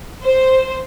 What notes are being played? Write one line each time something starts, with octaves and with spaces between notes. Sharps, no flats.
C5